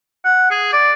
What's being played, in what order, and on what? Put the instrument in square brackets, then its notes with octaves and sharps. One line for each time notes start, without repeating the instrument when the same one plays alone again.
[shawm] F#5
G#4
D5